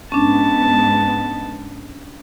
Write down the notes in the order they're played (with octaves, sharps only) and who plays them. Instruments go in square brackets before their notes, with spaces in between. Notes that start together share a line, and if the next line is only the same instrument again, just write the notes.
[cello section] G#2 B3 [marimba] C#4 D4 [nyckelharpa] A5